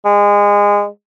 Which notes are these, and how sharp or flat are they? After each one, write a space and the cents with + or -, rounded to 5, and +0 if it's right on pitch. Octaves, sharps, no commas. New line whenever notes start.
G#3 -25